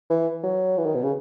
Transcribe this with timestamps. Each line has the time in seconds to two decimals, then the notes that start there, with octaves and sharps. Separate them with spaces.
0.10 E3
0.43 F#3
0.77 E3
0.86 D#3
0.95 B2
1.03 C#3